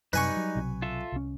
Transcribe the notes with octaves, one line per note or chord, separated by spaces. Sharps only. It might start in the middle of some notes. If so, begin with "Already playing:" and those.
F#2 C3 G3 D#4 B4 G#5 C#6
F#3
B1 C3 F#3
F4 A4 E5
C2 C#4